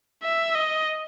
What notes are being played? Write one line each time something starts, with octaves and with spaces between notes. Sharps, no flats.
E5
D#5